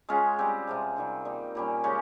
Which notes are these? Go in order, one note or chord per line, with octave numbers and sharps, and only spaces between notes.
G#3 C#4 F4 G#4
G3 C4 G4
C3 F3 G#3
C3 D#3 G3
G3 A#3 D#4
A#2 G3 C#4
C#3 G#3 C#4 G4